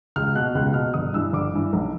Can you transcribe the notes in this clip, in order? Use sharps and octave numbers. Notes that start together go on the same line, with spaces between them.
C#2 F6
B2 F#6
C#2 F#6
B2 F6
G1 D#6
G2 E3 E6
G1 D6
G2 E3
B1